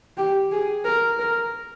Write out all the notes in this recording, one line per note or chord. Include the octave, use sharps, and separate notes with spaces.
G4
G#4
A#4
A#4